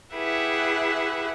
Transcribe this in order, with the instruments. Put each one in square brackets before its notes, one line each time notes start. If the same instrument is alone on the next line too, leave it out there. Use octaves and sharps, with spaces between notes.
[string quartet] E4 G4 G#4 B4 E5 F#5